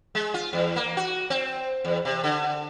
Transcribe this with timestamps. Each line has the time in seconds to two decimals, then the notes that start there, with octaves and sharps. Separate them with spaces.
0.15 G#3
0.34 F4
0.53 E2
0.76 A#3
0.97 F#4
1.30 C4
1.85 E2
2.05 C3
2.24 D3